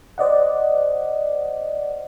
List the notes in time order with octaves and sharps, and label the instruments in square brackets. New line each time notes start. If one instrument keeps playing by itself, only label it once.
[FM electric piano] C5 D5 D#5 F#5